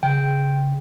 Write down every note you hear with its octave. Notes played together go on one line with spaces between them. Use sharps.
C#3 G5